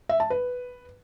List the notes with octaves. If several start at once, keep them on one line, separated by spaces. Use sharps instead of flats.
E5
A5
B4